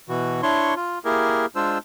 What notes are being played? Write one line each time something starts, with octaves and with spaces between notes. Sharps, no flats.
B2 E3 F#4
D4 E4 C#5 C6 C#6
F4
A#3 E4 G4 G#4 A#4
G#3 D4 F4 C5 E6